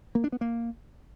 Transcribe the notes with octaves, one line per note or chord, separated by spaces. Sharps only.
A#3
D4
B3
A#3